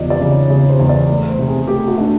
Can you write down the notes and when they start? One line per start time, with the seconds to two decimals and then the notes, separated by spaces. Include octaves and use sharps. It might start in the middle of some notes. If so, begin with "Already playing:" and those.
Already playing: E2 C#3 F3 D5 D#5
0.10 D5
0.20 C#3
0.30 C#5
0.50 C#3 C#5
0.69 C5
0.79 E2
0.89 D5
1.09 A3
1.29 C5
1.39 C3
1.48 G#4
1.68 A3 G4
1.88 F#4
1.97 A3 D4